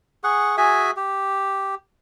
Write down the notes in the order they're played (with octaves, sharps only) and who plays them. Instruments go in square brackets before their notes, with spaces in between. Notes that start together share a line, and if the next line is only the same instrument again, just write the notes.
[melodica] G#4 F#5 C#6
F#4 G#4 E5 G#5
G4